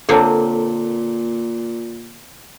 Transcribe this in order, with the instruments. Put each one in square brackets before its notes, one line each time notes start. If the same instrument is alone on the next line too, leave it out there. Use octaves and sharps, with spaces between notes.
[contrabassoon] A#2 [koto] D3 A#3 C4 [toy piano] A4 C#5 A5